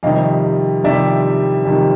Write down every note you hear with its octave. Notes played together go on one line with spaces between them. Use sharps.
F2 C3 D#3 G3 D#5 F5
F2 C3 D#3 G3 D5 E5
F2 C3 D#3 G3